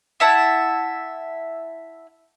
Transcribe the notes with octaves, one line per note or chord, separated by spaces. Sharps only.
E4 E5 F#5 A5